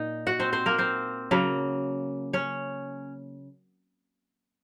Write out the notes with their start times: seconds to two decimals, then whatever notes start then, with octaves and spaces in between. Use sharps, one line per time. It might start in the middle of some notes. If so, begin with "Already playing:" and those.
Already playing: A#2 D#4 D#5
0.27 F#4 F#5
0.39 C4 C5
0.53 C4 C5
0.66 A#3 A#4
0.78 C4 C5
1.31 C#3 F#3 A#3
2.33 C#4 C#5